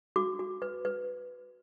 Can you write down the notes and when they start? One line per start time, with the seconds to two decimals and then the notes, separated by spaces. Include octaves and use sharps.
0.16 F#4 D6
0.39 F#4
0.62 B4
0.85 B4